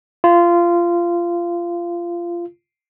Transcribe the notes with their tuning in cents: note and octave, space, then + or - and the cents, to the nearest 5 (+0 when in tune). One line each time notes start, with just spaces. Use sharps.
F4 -20